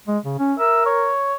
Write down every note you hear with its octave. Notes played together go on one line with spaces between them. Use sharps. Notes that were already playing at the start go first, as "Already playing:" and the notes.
G#3
C#3
C#4
A#4 E5
C#5